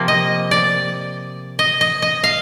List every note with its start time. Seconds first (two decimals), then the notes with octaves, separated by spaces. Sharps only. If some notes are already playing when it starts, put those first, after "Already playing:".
Already playing: C3 F3 A#3
0.08 D#5
0.51 D5
1.59 D#5
1.81 D#5
2.02 D#5
2.24 F5